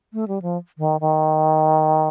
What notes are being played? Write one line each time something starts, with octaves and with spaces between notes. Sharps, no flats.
A3
G3
F3
D#3
D#3